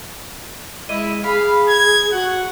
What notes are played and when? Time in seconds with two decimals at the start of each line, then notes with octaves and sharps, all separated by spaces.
0.89 G#3 E4 D#5
1.24 G#4 F5 B5
1.69 G#6
2.13 F#4 F#5